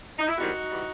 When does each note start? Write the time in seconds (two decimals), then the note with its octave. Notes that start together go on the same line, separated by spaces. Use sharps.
0.19 D#4
0.28 E4
0.38 E2 D#3 G3 C4 D#4 F#4
0.71 E3 G3